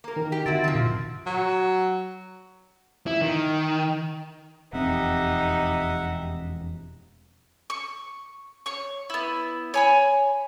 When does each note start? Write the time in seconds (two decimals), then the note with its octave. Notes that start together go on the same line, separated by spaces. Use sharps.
0.04 A#3 A#4
0.16 D#3
0.32 G4
0.46 D3 C4 E4 F#4
0.64 F3 C4
0.75 A#2
1.27 F#3
3.07 E4
3.21 D#3
4.73 E1 F2 C4 D#4 G4 E5 F#5
7.70 C#6
8.66 C#5 C#6
9.10 B3 E4
9.74 C#5 G#5 B5